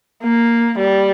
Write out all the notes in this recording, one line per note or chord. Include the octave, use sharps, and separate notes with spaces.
A#3
G3